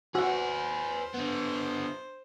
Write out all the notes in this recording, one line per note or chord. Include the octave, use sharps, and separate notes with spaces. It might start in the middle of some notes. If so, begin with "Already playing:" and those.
F#4 G#4 B4 C5 F#5
D3 B3